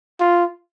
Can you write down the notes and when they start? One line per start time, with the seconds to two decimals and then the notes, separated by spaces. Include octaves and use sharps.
0.20 F4